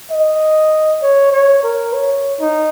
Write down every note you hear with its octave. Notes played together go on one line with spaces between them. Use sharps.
D#5
C#5
C#5
A#4
C#5
D#4